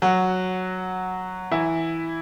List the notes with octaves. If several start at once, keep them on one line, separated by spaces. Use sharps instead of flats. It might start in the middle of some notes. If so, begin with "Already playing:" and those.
F#3 F#4
E3 E4